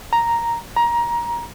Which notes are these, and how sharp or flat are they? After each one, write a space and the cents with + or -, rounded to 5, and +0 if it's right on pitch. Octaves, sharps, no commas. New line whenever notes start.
A#5 +0
A#5 +20